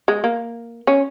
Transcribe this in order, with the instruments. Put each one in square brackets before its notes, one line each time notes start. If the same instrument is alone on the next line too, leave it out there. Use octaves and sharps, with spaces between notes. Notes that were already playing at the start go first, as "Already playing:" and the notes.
[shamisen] G#3
A#3
C#4